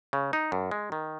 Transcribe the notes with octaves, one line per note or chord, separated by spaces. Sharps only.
C#3
D#4
F#2
G#3
D#3